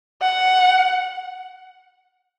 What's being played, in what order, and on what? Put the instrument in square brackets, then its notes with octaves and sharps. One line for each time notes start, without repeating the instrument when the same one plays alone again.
[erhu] F#5